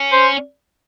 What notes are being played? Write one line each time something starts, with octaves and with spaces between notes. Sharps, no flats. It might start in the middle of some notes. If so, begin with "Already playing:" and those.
Already playing: C#4
C5